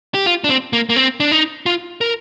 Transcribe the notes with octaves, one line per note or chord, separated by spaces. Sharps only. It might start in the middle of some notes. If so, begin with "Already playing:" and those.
G4
F4
D4
C4
A#3
A#3
C4
D4
D#4
F4
A#4